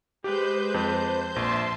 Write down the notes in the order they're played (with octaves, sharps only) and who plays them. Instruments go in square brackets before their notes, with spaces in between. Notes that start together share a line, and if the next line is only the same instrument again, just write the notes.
[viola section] G#3 B4 [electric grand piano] G4 [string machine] C5 G6
[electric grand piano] F2
[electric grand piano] A#1 [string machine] E5 A5 [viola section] C6